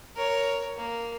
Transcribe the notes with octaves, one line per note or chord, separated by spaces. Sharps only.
A#4 C#5
A#3